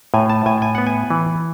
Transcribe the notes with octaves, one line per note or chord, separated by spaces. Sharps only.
A2 G#5
A5
A2 G#5
G#5
B3 F#5
G#5
E3